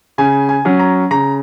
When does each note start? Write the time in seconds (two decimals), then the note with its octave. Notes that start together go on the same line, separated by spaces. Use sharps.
0.18 C#3 G#5
0.49 G#5
0.65 F#3 C#4
0.79 A#5
1.10 C#3 A#5